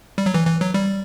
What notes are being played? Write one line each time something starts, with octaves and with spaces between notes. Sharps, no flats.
G3
F#3
E3
E3
F#3
G3